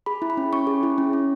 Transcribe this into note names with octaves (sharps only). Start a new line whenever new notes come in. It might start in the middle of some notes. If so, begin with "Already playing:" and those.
G#4 B5
E4
B5
C#4
C#4 C#6
G#4
E4
C#4
C#4